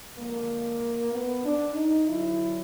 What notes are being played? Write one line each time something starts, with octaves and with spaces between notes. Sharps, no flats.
D3 F3 G#3 A#3
B3
D4
D#4
D3 F#3 E4